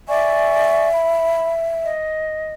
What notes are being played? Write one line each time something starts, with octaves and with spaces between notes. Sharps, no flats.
D5 E5 G#5 C#6
B5
D#5